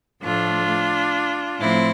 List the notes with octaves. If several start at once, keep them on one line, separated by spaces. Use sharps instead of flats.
A2 F3 A3 D4 F4
A2 F3 A3 C4 E4